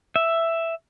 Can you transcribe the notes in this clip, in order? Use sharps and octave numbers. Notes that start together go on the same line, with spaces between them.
E5